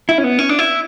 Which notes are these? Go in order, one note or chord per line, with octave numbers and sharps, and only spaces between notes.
E4
C#4
B3
C#4
D4
E4